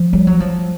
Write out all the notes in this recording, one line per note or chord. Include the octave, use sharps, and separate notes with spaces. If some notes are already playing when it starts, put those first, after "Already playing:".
Already playing: F3
G3
F#3
F3